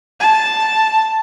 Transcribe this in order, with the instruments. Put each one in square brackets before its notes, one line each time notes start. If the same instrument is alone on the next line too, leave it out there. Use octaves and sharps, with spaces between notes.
[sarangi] A5